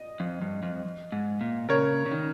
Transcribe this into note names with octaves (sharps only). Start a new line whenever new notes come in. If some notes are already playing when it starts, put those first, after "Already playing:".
Already playing: D#5
F2
G2
F2
G#2
A#2
C#3 A#4 C#5
C#3
D#3